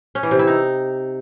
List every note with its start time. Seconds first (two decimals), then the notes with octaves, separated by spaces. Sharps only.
0.15 C#4
0.23 E3
0.31 C3
0.39 E4
0.47 D#4